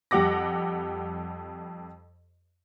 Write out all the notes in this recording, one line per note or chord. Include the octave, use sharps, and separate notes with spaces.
F2 G3 G4 F#5 D6 A#6